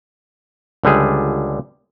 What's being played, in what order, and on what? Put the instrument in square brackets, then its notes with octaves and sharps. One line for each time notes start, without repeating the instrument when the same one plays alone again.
[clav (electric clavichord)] C#2 D3 G3 G#4